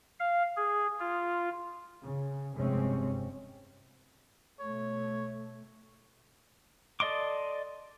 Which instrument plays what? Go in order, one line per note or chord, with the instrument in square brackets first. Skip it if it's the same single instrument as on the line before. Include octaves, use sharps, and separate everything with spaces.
[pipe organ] F5
G#4
F4
[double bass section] C#3
F1 G2 C3 G#3 C4 C#4
[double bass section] B2 A3 [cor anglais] C#5
[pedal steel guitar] A4 D5 D#5 C6 D6